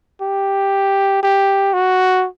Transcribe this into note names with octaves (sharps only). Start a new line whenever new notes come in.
G4
G4
F#4